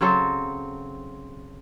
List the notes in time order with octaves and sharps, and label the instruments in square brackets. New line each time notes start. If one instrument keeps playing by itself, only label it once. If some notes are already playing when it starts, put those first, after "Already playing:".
[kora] C#3 F#3 C4 A4